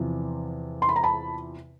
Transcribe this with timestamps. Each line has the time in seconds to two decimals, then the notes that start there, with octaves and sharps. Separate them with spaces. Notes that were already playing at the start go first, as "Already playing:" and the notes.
Already playing: E2 C3 F3
0.82 C6
0.89 B5
0.96 A#5
1.03 A5 B5